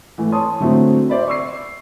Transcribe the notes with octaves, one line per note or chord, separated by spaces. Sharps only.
E3 A3
C#5 A5 C6 D#6
D3 F#3 A3 C4 E4 F#4
C5 D5 E5 B5
C#6 E6 C7